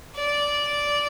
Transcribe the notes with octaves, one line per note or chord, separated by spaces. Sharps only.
D5